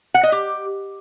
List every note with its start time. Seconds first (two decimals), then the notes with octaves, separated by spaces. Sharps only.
0.14 F#5
0.23 D#5
0.32 G4